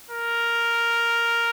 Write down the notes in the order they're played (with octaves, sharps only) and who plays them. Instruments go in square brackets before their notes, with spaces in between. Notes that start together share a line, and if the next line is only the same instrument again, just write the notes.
[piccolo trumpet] A#4